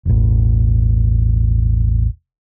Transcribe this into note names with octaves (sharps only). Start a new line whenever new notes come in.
E1 A1